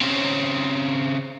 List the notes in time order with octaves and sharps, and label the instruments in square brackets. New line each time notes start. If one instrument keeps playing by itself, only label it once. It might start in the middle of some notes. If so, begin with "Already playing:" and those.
[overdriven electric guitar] C#3 C4